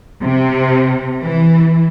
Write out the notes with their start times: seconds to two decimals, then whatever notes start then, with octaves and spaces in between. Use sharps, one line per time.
0.24 C3
1.22 E3